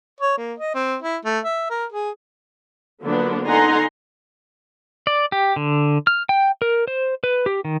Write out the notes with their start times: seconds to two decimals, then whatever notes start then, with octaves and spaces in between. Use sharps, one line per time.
0.20 C#5
0.37 A#3
0.59 D#5
0.75 C4
1.02 E4
1.25 A3
1.44 E5
1.70 A#4
1.92 G#4
3.01 D3 F3 F#3 A#3 B3 D4
3.46 D3 D#4 F#5 G#5 A#5 C6
5.07 D5
5.32 G4
5.56 D3
6.07 F6
6.29 G5
6.62 A#4
6.88 C5
7.24 B4
7.46 G4
7.65 D#3